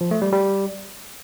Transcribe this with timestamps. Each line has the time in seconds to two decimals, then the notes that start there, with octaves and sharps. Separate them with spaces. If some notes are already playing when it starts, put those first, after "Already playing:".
0.01 F3
0.11 A3
0.22 G3
0.32 G3